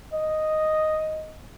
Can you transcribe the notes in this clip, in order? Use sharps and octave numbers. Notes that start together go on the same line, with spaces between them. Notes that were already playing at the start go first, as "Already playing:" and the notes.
D#5